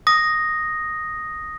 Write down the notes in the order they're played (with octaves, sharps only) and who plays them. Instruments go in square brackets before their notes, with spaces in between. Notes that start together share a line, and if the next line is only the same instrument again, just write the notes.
[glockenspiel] D#6 A#6